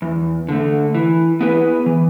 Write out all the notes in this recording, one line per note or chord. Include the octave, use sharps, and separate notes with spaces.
E2
D3 A3
E3
B3 E4 G#4 B4
E3